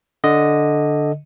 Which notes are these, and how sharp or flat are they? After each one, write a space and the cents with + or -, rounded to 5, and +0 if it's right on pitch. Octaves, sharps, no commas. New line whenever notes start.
D3 +0 D#5 +0